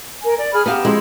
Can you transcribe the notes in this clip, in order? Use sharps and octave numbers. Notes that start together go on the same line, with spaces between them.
A#4 G#5
D5
G#4 B5 F6
B3 G4 F5 A5 A#5
F3 G#3 E4